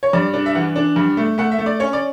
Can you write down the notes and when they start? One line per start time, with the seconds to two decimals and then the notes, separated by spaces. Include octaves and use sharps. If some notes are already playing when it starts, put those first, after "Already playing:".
0.03 C#5
0.13 G2 D5
0.33 D4
0.46 E5
0.55 E3 F#5
0.76 D4
0.96 G2
1.17 A3
1.38 A3 F#5
1.52 E5
1.58 A3
1.66 D5
1.80 C#4 C#5
1.93 D5